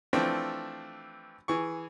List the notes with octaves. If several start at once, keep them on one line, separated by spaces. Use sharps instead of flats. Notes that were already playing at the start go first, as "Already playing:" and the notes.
E3 F3 A3 C4 D4
E3 G#4 C#6